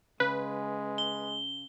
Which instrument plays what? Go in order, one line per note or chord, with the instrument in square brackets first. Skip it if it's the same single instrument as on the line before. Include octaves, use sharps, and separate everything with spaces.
[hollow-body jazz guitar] C#3 [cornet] G#3 [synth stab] B4
[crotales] G7